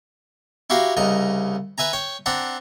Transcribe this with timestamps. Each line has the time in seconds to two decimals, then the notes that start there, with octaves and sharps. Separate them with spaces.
0.70 E4 F#4 G4 F5 A#5
0.97 C2 C#3 D#5 A#5
1.78 B4 E5 G#5 A#5
1.93 C#5 G5
2.26 C4 D4 F#5 A#5